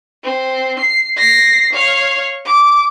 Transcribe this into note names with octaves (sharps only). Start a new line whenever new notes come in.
C4
C7
A#6 C7
C#5 F5
D6